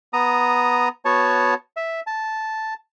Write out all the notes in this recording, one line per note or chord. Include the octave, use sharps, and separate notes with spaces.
B3 A#5 D#6
B3 F#4 C#5 A5
E5
A5